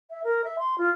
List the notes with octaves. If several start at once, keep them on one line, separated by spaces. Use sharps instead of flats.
E5
A#4
E5
C6
F4